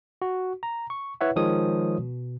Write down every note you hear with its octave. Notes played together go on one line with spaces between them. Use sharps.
F#4
A#5
C#6
E4 B4 C#5 E5 F#5
D#3 F3 G#3 C#5 D#6
B2